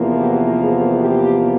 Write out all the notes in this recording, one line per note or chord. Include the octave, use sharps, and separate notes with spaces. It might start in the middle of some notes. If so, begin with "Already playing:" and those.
Already playing: E2 C3 F3 A#3
G4
G#4
G4